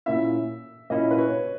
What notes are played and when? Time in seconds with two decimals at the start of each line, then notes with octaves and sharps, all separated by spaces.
0.06 A#2 A#3 C#4 E4 E5
0.90 A#2 A#3 C#4 E4 D#5
1.11 B4
1.18 C#5